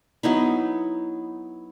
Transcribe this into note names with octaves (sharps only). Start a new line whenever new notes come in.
F#3 B3 D#4 E4